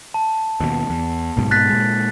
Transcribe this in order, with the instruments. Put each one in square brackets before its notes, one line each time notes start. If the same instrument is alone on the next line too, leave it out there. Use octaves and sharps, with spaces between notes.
[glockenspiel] A5
[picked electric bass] D#2 B2
E2
B1 G#2 B2
[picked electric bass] G#2 B2 [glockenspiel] F#6 A6 B6
[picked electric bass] A#2 G#3